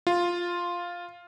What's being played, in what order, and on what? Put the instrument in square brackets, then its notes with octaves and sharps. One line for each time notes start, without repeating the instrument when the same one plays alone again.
[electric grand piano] F4